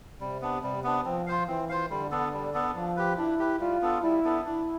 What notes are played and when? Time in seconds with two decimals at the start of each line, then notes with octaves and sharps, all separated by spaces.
0.21 C3 G3
0.41 B3 D4
0.62 C3 G3
0.84 B3 D4
1.05 F3 C4
1.26 F4 C5 F5
1.48 E3 C4
1.69 F4 C5 F5
1.90 D3 G3
2.11 B3 D4 A4
2.33 G3
2.54 B3 D4 A4
2.75 F3 D4
2.96 G4 B4
3.17 D4 E4
3.39 G4 B4
3.60 G3 F4
3.82 B3 D4 A4
4.02 G3 E4
4.24 B3 D4 A4
4.45 D4 E4